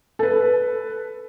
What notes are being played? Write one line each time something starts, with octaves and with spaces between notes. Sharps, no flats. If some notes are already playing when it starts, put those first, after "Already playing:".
A4 B4